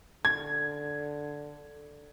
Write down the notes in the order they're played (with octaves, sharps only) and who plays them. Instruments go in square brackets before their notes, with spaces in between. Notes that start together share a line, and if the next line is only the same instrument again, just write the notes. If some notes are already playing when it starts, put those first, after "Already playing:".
[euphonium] D3 [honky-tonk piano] G#6